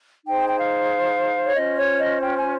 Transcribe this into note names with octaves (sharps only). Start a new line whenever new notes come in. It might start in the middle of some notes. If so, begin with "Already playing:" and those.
D#4 G#4 C5 G5
G5
F5
C#5
C#4 F4 C5 D#5
C#5
D#5
G5
G#5